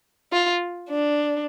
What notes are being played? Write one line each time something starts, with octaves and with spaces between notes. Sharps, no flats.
F4
D4